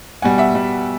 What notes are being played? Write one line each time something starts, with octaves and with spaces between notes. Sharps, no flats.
B2 G3 F#5 G#5
E5 F#5
B2 G3